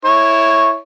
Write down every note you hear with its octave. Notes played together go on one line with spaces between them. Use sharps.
E4 C#5